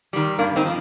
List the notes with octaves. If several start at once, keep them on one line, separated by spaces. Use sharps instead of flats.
D#3 G3
G2 A#3 D4
C4 D#4
F3